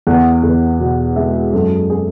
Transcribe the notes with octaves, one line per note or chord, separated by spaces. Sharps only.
E2 F#5
E2
B2
G#3 E5
F#2 A4
G#4